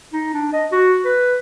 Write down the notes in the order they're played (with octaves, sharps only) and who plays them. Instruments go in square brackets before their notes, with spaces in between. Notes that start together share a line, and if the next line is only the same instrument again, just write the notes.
[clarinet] D#4
D4
D#5
F#4
B4